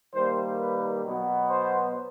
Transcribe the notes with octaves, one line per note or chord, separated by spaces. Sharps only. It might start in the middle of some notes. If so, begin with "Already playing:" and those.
D#3 G3 A#3 C5
B4
B2 F#3 B3
C5